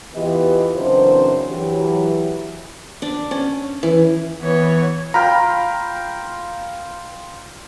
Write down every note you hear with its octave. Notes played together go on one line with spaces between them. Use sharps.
E2 E3 B3 F4 G4 D#5
F#2 C#3 E3 C4 D4 C5
E3 F#3 G4
D4
C#4
E3
E3 B3 C#5
F4 G5 A#5 B5 F6